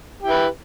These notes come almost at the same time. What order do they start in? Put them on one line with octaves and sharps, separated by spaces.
G4 E4 B4